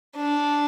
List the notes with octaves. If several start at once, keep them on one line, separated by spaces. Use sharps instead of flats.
D4